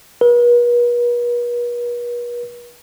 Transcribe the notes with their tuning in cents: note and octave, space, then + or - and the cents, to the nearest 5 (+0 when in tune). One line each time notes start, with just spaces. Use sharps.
B4 -45